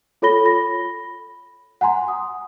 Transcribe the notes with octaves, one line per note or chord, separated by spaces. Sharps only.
F4 A4 C#5 B5 A#6 G7
B5 A#6
F#5 G#5 A#5 C6
D#6